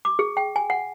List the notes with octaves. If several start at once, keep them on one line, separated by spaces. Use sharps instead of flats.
D6
G#4
G5
G#5
F#5